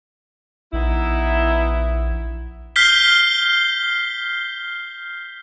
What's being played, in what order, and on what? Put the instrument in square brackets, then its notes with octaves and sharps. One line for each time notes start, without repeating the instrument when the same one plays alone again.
[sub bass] A#1 [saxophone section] B3 D#4 E4
[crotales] F6 G6 B6 C7 G7